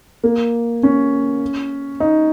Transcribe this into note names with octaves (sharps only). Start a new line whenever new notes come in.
A#3
C#4
D#4